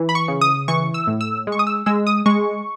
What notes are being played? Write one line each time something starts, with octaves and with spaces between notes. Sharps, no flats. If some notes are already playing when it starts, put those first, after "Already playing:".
Already playing: E3
B5
C#6
C#3
D#6
E3 C#6
E6
A2
E6
G#3
C#6
D#6
E6
G#3 E6
D#6
G#3 C#6